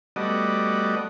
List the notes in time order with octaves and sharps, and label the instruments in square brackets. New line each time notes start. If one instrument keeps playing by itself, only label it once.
[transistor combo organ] G3 A3 B3 F#4 D5 D#5